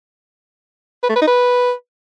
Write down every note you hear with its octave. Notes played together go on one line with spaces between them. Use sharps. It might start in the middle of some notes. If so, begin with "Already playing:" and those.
B4
A3
B4
D#4
B4